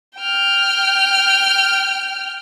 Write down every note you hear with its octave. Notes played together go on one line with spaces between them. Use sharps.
G5 F6